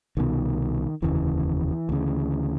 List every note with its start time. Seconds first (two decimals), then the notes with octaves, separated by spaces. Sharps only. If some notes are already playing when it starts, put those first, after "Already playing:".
0.17 C2 B2 D#3
1.02 F1 D#2 C#3 E3
1.89 D2 C#3